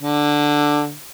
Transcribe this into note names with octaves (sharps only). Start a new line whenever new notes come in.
D3